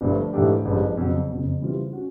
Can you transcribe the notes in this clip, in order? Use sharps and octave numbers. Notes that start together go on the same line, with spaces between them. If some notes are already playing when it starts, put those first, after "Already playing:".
G1 G2 D3 F3 A3
G#2 E3 A3 D4 G4
A1 G2 D3 F3 G#3
F2 C#3 F#3
F#1 F2 C#3
C#3 E3 G3 C4 F4
C#4 F#4